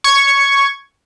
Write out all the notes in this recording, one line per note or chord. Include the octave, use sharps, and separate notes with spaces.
C#6 G#6